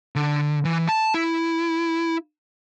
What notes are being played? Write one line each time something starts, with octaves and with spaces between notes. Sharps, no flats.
D3
E3
A5
E4